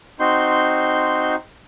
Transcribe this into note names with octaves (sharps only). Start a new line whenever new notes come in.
C4 D#4 F#4 C6 G6